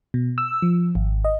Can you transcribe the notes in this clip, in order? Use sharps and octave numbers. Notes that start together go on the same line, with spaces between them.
B2
E6
F3
G#1
D#5